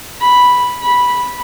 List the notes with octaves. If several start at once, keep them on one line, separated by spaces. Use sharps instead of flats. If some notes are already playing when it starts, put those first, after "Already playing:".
B5
B5